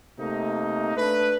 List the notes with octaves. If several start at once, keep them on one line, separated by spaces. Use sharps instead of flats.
C3 A3 A#3 D#4
A3 D4 B4